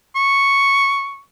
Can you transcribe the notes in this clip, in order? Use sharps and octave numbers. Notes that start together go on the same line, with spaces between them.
C#6